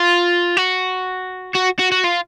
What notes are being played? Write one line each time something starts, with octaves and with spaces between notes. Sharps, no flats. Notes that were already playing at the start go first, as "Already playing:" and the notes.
Already playing: F4
F#4
F#4
F#4
F#4
F4